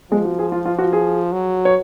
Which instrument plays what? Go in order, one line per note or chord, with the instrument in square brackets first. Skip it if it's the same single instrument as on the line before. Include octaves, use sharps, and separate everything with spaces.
[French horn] F3 [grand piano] G#3
[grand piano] F#4
G#4
F4
F4
F#4
G#4
[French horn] F#3
[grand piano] C#5